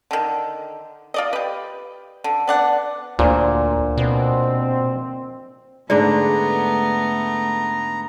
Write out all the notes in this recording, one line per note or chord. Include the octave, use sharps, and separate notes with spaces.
D3 D#3
F4 D5 D#5
G4 B4
D3
B3 D4 F#5
D2 A#2 D4 A#4 C5
B2 C4
G#2 D3 A3 B3 D4 D5 A#5